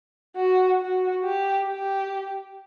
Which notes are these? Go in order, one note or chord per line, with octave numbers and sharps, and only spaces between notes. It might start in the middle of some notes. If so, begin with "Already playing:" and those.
F#4
F#4
G4
G4